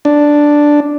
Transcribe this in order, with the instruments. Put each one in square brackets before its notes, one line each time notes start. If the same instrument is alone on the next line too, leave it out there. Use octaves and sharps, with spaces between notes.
[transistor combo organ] D4